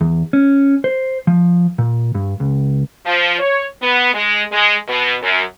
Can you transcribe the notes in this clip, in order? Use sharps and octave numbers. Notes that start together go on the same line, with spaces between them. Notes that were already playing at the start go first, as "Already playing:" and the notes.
E2
C#4
C5
F3
A#2
G2
C#2
F3
C#5
B3
G#3
G#3
B2
F#2